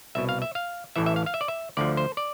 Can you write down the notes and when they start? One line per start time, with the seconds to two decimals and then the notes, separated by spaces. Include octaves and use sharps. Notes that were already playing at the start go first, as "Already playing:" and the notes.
0.15 C2 B2 E5
0.29 F5
0.42 E5
0.55 F5
0.96 A1 A2 E3 E5
1.06 E5
1.16 F5
1.26 F5
1.34 E5
1.41 D5
1.48 E5
1.77 D2 D3 F3 D5
1.97 C5
2.17 D5